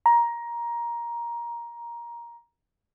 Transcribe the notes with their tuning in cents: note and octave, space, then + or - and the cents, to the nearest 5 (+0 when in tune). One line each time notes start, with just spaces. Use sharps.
A#5 +15